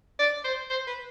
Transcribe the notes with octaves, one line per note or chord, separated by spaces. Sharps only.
D5
C5
C5
B4